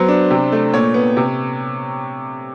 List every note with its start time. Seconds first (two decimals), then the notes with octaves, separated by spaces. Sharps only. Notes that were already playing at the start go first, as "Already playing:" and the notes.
Already playing: F#3 B3 C5
0.08 D4
0.31 C3
0.52 A3
0.74 A#2 C#5
0.94 B3
1.17 C3